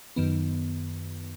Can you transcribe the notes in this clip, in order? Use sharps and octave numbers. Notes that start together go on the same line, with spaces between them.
F#2 D#3 B3